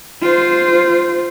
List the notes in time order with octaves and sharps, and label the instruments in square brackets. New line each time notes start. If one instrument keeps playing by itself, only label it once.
[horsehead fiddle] F4 C5